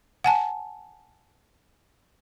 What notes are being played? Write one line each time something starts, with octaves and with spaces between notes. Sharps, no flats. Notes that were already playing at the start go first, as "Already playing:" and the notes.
F#5 G#5 A5